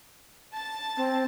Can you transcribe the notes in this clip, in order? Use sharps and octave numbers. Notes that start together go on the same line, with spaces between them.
A5 A6
C4